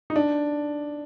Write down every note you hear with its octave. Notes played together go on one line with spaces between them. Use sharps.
D#4
D4